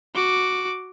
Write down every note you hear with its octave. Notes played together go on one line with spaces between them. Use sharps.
F#4 D6